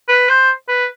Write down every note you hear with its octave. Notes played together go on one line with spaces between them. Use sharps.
B4
C5
B4